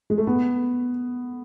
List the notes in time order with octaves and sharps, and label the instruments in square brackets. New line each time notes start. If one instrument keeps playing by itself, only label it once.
[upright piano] G#3
A3
B3